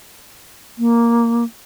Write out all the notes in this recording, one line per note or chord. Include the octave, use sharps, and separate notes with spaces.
A#3